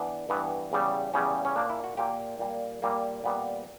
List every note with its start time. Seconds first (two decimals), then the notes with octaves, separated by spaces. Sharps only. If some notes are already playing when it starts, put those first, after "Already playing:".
Already playing: E3 B3 D4
0.29 G2 E3 B3
0.72 E2 C#3 G3
1.14 E2 C#3 G3 C#4
1.45 C#4
1.56 A#2 A#3 D4
1.70 E4
1.84 F#4
1.97 A#2 A#3 G4
2.39 A#2 G3 A#3
2.82 A#2 G3 A#3
3.24 A#2 G3 B3